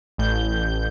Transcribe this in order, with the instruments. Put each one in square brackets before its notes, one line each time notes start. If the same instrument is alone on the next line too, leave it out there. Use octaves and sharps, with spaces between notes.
[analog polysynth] A1 G6